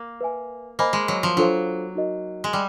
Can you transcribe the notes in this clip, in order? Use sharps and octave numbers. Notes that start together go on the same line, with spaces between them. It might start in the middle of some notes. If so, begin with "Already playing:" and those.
Already playing: A#3
B4 E5 G#5
A#3 C5 D#5 G#5 B5
G#3
F#3
F3
F#3 D4 F4 A4 C5 F5
D#4 F#4 A#4 D#5
G#3
G3